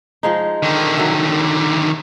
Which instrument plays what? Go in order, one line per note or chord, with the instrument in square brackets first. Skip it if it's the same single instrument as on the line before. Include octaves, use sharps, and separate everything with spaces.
[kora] F3 G#3 D#4
[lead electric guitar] D3 D#3
[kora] F#3 E5